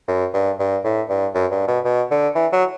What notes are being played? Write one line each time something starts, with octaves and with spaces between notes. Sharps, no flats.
F#2
G2
G2
A2
G2
F#2
G2
B2
B2
D3
E3
F#3